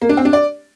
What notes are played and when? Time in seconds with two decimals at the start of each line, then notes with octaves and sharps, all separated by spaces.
0.02 A#3
0.09 D4
0.17 C4
0.25 D4
0.33 D5